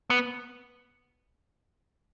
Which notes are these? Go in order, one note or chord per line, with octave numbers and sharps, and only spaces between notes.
B3